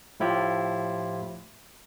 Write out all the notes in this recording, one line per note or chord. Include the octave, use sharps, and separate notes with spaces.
A2 F3 E4 F4 G4